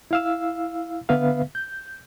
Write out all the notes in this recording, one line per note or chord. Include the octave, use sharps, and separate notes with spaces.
E4 F5 E6
D3 B3 B4 E5 F5
G6